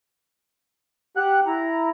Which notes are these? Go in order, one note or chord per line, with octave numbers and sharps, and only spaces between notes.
G4 F#5 F#6
E4 A#5